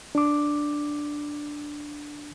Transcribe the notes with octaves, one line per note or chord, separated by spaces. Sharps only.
D4 D6